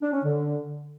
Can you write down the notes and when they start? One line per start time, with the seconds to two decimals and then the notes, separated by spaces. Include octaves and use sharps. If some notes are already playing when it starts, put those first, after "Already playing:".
0.02 D4
0.13 C#4
0.24 D3